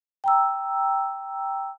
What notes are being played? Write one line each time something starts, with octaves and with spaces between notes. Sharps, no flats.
G5 A#5 E6